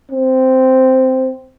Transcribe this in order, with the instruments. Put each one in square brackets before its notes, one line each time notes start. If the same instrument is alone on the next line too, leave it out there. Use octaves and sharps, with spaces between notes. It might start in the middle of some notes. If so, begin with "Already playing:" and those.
[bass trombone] C4